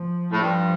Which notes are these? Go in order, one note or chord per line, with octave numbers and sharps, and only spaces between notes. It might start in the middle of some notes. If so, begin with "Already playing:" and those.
Already playing: F3
A2
G2 F3